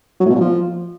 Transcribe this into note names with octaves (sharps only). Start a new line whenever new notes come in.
F#3
A2
B2
A#2
F3